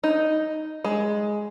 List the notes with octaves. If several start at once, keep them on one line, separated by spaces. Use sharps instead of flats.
D#4
G#3